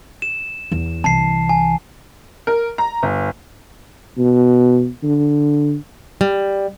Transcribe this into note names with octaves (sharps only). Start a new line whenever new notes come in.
E7
E2
C2 E3 A5 C7
G#5
A#4
A#5
G1
B2
D3
G3